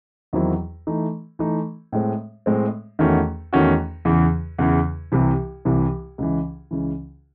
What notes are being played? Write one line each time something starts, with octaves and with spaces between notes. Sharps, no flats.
E2 D#3 F#3 C4 E4
E3 A3 D#4
E3 A3 D#4
A2 G#3 C4
A2 G#3 C4
E2 D#3 A3 C#4 F#4
E2 D#3 A3 C#4 F#4
E2 C#3 E3
E2 C#3 E3
C2 C3 E3
C2 C3 E3
C#2 C#3 E3
C#2 C#3 E3